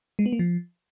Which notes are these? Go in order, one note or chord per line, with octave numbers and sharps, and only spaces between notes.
G#3
B3
A#3
F3